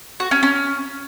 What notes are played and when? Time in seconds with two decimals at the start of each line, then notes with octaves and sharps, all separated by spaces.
0.20 F#4
0.31 C#4
0.43 C#4